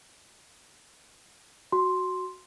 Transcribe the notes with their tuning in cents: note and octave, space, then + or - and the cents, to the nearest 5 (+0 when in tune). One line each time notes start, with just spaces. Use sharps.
F#4 +0 C6 +0